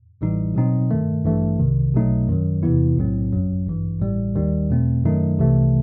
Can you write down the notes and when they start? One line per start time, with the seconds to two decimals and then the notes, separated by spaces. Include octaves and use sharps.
0.21 A1 A2 E3 G3 D#4
0.55 B2 F#3 C4 D#4
0.91 G2 D#3 A3
1.24 A1 G2 E3 A3
1.59 C2 C3 D#3
1.94 B1 B2 F#3 A3 D#4
2.28 F#2 D#3 F#3
2.63 E2 C3 E3 B3 E4
2.97 B1 A2 F#3 C4
3.32 G1 F#2 F#3
3.67 A1 G2 E3
4.00 A1 A2 G3
4.35 D#2 D#3 G3 D#4
4.70 E2 B2 A3 C4
5.04 F#2 D#3 F#3 A3 D#4
5.38 C2 C3 E3 A3